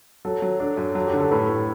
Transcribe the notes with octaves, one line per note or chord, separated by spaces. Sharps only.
F#3 A4
F#3
D4 A4
F#2
F#3 A4
G4
D3
A4
A2 B4
A2